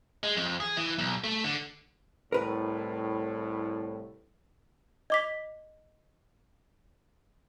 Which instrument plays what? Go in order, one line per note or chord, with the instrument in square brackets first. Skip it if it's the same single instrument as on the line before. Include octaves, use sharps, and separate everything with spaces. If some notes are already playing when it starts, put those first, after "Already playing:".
[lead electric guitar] G#3
F2
G#4
E3
B1
A3
D3
[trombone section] C2 A2 [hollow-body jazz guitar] A#4 B4
[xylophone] D#5 D6 B6